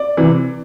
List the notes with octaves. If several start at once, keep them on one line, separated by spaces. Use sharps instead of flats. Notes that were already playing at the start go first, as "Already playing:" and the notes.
Already playing: D5
C3 E3